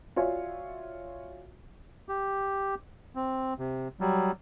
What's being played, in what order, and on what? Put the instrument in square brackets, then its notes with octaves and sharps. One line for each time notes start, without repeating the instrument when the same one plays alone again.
[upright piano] F4 F#4 C#5 D5 E5 G#5
[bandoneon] G4
C4
C3
F#3 G3